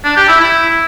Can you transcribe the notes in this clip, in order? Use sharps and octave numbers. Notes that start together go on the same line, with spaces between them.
D4
G4
E4
E4